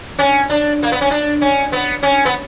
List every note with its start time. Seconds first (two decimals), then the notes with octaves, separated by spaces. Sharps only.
0.19 C#4
0.50 D4
0.83 A#3
0.92 B3
1.01 C#4
1.11 D4
1.41 C#4
1.72 B3
2.03 C#4
2.25 B3